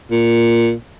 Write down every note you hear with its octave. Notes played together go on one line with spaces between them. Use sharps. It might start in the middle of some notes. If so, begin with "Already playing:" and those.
A#2